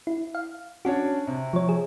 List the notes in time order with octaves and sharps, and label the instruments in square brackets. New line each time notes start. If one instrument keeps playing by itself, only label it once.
[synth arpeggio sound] E4
F5
[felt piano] C#4 D4 C#5 [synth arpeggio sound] F#4
[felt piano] C3
[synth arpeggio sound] F3 C#5
G#4